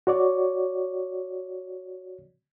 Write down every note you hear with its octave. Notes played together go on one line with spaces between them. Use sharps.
F#4 C#5 D5